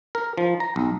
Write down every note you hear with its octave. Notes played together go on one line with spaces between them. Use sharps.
A#4
F3
A#5
B1